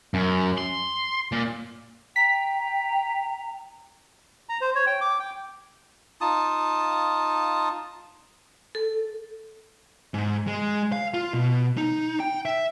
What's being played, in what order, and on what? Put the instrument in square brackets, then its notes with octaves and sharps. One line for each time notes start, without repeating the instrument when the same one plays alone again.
[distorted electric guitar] F#2
C6
A#2
[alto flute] G5 [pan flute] A#5 [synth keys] B6
[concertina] A#5
C5
C#5
G5
D6
G5
[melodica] D#4 F4 A5 D#6
[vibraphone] A4
[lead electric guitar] G#2
G#3
F5
F4
B2
D#4
G5
E5